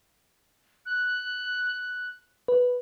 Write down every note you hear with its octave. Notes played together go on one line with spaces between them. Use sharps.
F#6
B4